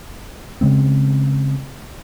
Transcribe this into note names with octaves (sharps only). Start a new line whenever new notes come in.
C#3 G#3 C4